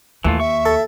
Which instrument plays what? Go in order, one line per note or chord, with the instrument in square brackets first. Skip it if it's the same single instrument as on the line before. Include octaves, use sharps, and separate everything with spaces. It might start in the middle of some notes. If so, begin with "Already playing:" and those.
[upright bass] D#2 [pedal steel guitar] E3 A3 F4
[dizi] E5 [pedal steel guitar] C#6
[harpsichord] A4